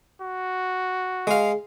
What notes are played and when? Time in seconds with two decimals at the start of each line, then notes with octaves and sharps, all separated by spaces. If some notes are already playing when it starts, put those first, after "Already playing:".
0.22 F#4
1.27 G#3 F5